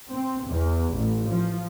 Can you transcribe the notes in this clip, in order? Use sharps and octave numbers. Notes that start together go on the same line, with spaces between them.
C4
E2
A1
F3